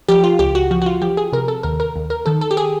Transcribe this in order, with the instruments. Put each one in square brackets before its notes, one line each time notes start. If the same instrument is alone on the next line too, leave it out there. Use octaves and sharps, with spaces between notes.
[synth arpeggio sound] F3 G4
F4
C#2 G4
F#4
F3 F#4
F#4
F4
F3 G4
G#4
C3 A#4
A4
D#2 A#4
A#4
D#2
A#4
D#3 A4
A4
G4
G#4